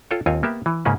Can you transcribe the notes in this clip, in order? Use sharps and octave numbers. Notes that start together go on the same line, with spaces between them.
F4 A4 C#5 G5
D#2 C4 F4 C#5 G#5
A#3 B3 G4 E5
E3
G#2 C#3 A#3 C#4 B4